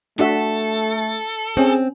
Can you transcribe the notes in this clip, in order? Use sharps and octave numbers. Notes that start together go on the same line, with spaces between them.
A3 D4 F#4 A4 E5
C4 C#4 G#4